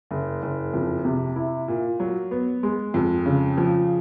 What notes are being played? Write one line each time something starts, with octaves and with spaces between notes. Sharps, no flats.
F#1
F#1
F2
C3
E4
A#2
F#3
B3
G#3
F2
C#3
F3